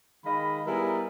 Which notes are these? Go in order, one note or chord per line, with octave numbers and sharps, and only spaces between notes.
D#3 G#3 D#5 F5 B5
G3 B3 E4 G#4 A#4